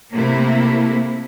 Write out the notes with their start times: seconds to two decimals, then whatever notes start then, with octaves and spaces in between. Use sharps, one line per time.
0.15 C3 A3 A#3 E4